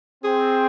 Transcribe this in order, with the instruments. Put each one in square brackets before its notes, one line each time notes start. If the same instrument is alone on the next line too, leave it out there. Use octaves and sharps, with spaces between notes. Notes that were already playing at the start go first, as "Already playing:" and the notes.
[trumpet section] C4 [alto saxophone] G#4